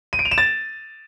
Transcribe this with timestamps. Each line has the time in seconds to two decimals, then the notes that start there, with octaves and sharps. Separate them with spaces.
0.13 D#7
0.19 D7
0.25 F7
0.31 E7
0.38 A6